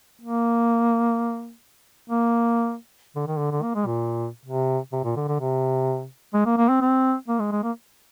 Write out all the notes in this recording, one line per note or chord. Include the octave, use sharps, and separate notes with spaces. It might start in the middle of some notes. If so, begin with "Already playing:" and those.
A#3
A#3
D3
D#3
D3
D3
A#3
G#3
A#2
C3
C3
A#2
D3
D3
C3
G#3
A#3
A#3
C4
C4
A#3
G#3
G#3
A#3